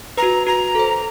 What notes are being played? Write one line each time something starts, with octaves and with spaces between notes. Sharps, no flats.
F#4 B4 A#5
F#4 A#5
A4 C5